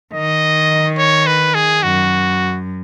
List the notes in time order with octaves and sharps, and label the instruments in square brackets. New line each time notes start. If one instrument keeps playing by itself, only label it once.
[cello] D#3 [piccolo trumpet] D#5
[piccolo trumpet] C#5
B4
G#4
[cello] F#2 [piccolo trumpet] F#4